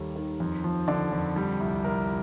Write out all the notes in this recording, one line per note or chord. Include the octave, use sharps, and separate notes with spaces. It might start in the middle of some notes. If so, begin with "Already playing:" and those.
Already playing: D#2 D#3 G3 A4
D#3
F2
F3
D3 D5
F2
G3
C2
C2 A#4